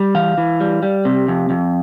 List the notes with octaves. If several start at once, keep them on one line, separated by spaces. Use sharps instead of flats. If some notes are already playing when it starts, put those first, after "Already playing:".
Already playing: G3
E3 F5
E3
G3
G3
C3
F2
F2